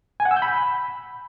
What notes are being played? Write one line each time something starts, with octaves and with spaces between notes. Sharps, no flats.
G#5
F#5
E6
G6
B5